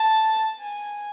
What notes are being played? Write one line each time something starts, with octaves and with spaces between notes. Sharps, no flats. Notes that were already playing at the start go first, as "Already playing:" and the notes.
Already playing: A5
G#5